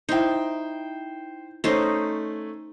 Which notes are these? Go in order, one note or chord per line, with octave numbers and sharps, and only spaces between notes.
D#4 E4 C5 G5
A3 C#4 D#4 C5 D#5